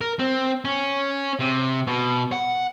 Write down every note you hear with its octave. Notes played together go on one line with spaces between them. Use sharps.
A#4
C4
C#4
C3
B2
F#5